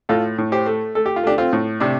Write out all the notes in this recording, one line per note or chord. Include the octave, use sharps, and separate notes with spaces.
A2 F4 A4
A2
G4 C5
A3
A3 A4
G4
F4
A3 D4 G4
C4 F4
A2
C3 D4